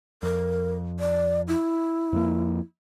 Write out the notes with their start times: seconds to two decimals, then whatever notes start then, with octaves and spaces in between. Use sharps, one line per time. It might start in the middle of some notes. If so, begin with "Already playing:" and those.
0.23 F2 A#4
1.00 D5
1.48 E4
2.13 F2 F3 A#3